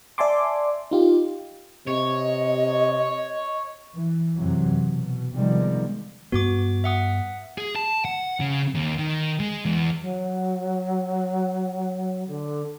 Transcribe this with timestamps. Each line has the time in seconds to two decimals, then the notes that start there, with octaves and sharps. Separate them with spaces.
0.18 D5 E5 G#5 A5 C6 D6
0.91 D#4 F4 G4
1.87 C3 C#5 D#5
3.94 E3
4.37 F#2 C3 E3 F#3
4.87 B2
5.35 C3 D#3 F3 G3 G#3 B3
6.32 G2 B3 F#4 D6
6.84 E5 F#5 D#6
7.58 G#4
7.76 A5
8.05 F#5
8.40 C#3
8.75 D#2
8.98 D#3
9.40 G#3
9.65 E2
10.00 F#3
12.27 D3